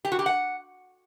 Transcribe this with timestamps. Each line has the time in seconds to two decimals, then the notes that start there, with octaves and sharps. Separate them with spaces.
0.05 G4
0.12 F#4
0.19 G4
0.26 F#5